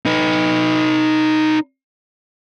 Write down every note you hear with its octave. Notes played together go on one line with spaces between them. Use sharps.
D#4 B4